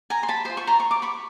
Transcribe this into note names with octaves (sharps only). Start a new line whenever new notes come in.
G#5 A#5
C6
A5 B5
F4 G#4 C5 C6
C#6
A#5 C6
C#6
D6
B5 C#6